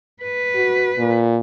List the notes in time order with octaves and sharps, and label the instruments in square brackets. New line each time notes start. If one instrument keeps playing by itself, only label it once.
[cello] B4
[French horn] F#4
A#2